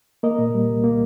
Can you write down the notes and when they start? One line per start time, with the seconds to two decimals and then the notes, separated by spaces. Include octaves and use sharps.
0.23 A#3 A#4 D#5
0.38 A#2
0.54 G3
0.69 C2
0.84 A#3